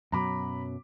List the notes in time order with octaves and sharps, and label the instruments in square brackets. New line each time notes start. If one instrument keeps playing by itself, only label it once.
[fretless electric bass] F#2 B2 F#3 [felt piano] A#5 B5 D6